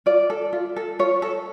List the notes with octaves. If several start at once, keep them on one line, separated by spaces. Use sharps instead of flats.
F4 D5
A4
F4
A4
F4 C#5
A4